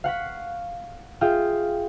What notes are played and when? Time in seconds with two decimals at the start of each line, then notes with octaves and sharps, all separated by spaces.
0.04 F5 F#5 C#6 B6
1.21 F4 G#4 E5 F5 G5 D#6